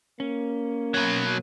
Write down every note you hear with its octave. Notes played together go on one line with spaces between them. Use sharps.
A#3 C#4
B2 F#3